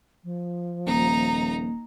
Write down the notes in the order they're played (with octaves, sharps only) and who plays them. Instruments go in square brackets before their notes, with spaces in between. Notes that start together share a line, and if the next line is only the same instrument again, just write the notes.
[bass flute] F3
[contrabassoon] D#1 [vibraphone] A#3 [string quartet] D#4 A#5